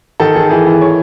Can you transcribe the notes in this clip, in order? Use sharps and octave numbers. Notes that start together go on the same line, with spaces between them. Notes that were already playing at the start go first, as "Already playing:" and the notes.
D#3 A4
D#3 G#4
E3 G#4
E3
C#5